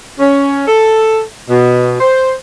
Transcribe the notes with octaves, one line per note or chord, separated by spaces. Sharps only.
C#4
A4
B2
C5